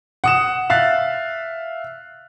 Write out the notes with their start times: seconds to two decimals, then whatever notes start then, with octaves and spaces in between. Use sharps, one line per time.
0.24 F#5 D#6 E7
0.70 E5 F5 F#6 A6